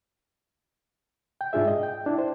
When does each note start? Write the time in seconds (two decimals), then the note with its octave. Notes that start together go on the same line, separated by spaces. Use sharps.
1.41 G5
1.53 G#2 D4 F4 G#4 E5
1.68 D#5
1.83 G5
2.06 D4 E4
2.18 C5